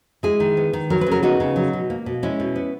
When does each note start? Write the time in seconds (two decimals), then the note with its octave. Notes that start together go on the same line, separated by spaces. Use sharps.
0.23 G#3 E4 G#4
0.40 D#3
0.57 B3
0.73 D#3
0.90 F#3 A#4
1.01 B4
1.06 C#3
1.11 F#4 A#4
1.23 B3 D#4 F#4
1.40 C#3
1.56 F#3
1.73 B2
1.90 A#3
2.06 B2
2.23 G#3 C#4 E4
2.40 B2
2.56 B3